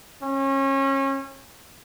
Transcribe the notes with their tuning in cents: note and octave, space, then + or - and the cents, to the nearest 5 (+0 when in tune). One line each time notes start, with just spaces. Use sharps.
C#4 -30